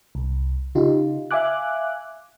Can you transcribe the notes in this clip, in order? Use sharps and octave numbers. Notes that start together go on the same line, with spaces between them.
C2
C#3 D#4 F4 G4
E5 F5 G#5 D6 F#6